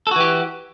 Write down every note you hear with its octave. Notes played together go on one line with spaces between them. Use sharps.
E3 F#4 G4 A4